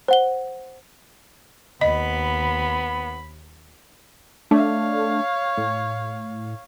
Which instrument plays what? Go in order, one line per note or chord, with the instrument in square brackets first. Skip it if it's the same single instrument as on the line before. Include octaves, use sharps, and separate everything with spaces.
[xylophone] C5 F#5 G7
[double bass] D#2 [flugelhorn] B3 [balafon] D#5 [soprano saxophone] B5
[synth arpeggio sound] A3 D4 [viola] C#5 F5
[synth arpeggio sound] A2